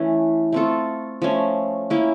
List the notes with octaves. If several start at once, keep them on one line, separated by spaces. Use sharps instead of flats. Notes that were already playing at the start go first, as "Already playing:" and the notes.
Already playing: E3 A3 C#4
A3 C4 F4 A4
F3 A3 C#4
A#3 C#4 E4